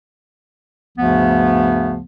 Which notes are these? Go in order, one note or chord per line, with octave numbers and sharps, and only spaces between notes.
D2 G2 C#3 F3 A3 B3